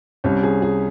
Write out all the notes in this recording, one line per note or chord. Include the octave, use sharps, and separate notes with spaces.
C2 C3 G3 C#4
G#4
G#4